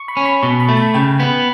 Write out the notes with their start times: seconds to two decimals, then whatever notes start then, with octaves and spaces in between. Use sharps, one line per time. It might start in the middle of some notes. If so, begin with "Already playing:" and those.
Already playing: C#6
0.08 B5
0.17 C#4
0.26 B5
0.42 B2 C#6
0.60 B5
0.69 A3
0.77 A5
0.94 C#3 G5
1.20 B3 B5